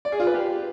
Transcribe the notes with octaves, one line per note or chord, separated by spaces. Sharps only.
D5
G#4
F4
B4
G4